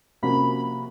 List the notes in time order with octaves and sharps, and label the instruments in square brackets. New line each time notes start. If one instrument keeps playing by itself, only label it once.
[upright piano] C3 F3 A#3 C#4 F#4 [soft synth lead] B5